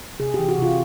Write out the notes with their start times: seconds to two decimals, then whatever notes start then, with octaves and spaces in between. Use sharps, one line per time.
0.20 C3 G#4
0.34 E3 G4
0.49 F#4
0.58 C3 F4